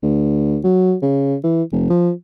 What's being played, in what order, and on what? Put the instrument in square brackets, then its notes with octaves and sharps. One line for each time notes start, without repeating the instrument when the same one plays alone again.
[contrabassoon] D2
F#3
C#3
E3
F1
F3